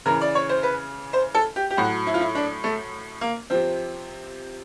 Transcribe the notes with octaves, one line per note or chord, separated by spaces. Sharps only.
C#3 E3 A#4
D5
C#5
C5
B4
C5
A4
G4
G4
A2 F#3 F#4
E4
F4
E4
D4
A3
A#3
C3 F3 C4